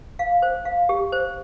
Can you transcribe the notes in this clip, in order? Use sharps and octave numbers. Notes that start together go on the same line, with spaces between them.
F5
C5
F5
G4
C5